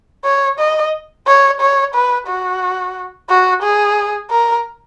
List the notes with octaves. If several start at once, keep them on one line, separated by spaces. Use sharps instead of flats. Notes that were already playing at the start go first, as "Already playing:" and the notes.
C#5
D#5
C#5
C#5
B4
F#4
F#4
G#4
A#4